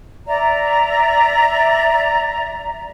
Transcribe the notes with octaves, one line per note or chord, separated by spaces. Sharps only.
D5 E5 A#5